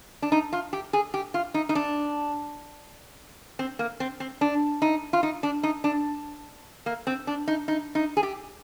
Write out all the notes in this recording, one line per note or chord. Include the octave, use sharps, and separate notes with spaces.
D4
D#4
F4
G4
G#4
G4
F4
D#4
D#4
D4
C4
A#3
C4
C4
D4
D#4
F4
D#4
D4
D#4
D4
A#3
C4
D4
D#4
D#4
D#4
G#4
G4